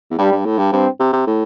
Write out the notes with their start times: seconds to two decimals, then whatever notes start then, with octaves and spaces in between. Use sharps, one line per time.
0.11 E2
0.18 G2 G3
0.31 G2
0.45 A2
0.58 G2
0.72 G2 C4
0.99 C3
1.13 C3
1.27 A2